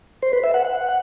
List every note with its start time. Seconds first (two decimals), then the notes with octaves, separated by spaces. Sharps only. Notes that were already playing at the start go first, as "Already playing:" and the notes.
0.22 C5
0.33 B4
0.44 E5
0.54 F#5
0.65 F#5